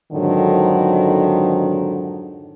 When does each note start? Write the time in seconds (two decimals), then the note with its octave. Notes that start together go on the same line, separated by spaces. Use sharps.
0.13 F2 G#2 D3 D#3 F#3